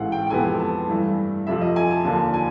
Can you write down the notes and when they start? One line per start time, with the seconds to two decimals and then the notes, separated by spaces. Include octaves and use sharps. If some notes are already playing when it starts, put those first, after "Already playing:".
Already playing: A1 G#2 E3 A3 F5 F#5
0.12 G5
0.27 G5
0.30 F2 C3 E3 G#3 B3 G#5
0.60 A5
0.89 G2 E3 A3
1.47 F2 C3 F3 E5
1.61 D#5
1.76 G#5
1.91 A5
2.05 D#2 D3 F3 A#3 A5
2.34 G#5